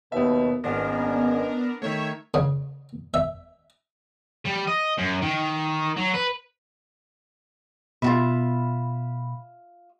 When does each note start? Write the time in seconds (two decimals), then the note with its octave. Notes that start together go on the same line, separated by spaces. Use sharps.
0.12 D#2 B2 B3 E5
0.64 G#1 A#2 G#3 B3 C#4 D4 A#4
1.82 D#3 A3 C#5 E5
2.34 C#3
3.14 E5
4.45 G3
4.67 D#5
4.98 F#2
5.22 D#3
5.97 F#3
6.14 B4
8.02 B2 F4 F#4 E5 B5